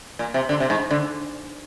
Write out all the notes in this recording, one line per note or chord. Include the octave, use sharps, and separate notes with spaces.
A#2
C3
D3
C3
G#2
D3